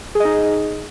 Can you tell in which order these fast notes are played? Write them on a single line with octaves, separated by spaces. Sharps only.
G#4 D#5 D#4